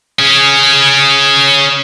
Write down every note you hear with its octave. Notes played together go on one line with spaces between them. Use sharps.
C#4 G#4